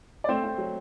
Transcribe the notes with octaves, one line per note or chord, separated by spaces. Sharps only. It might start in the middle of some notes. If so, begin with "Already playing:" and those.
D5
A3 C4 C5
C4
F#3